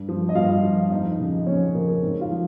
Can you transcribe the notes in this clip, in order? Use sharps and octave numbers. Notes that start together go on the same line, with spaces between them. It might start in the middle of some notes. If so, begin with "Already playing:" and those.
Already playing: G2
F3
D#5
G2 F4 F5
F3
F2 D#4 D#5
C#3 F3
F2 C#4 C#5
C#3 F3 A#3 A#4
G#2 C4 C5
F4 F5
F3